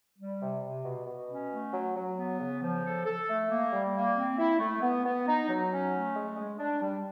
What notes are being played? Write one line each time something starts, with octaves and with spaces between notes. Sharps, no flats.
G3
C3
C3
B2
B2
C#4
A3
F#3
F#3
B3
C#3
F3
A4
A4
A3
A#3
G3
A#3
C4
E4
A3
B3
B3
D#4
F#3
C#4
A3
G#3
G#3
D4
G3